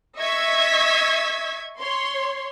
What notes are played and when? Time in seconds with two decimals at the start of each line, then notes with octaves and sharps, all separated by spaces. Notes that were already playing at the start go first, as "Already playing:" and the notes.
0.17 D#5 E5 C#6 E6 G#6 B6
1.79 C#5 C6